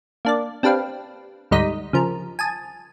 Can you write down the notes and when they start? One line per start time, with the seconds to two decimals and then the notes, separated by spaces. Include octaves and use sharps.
0.25 A#3 D4 D5
0.63 C4 D4 G4 B4 F5
1.51 D2 G#2 G3 D#4 D#6 B6
1.93 C#3 F3 A#4
2.39 G#5 A5 D#6